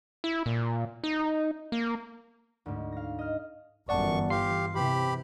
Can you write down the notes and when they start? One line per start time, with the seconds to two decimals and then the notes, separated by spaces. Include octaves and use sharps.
0.24 E4
0.46 A#2
1.04 D#4
1.72 A#3
2.66 D2 G#2
2.92 F5 A#6
3.19 D#5 F6
3.89 G1 F#2 E3 D5 F#5 A5 C#6
4.30 G4 F5 C6 C7
4.75 C3 E3 G4 B5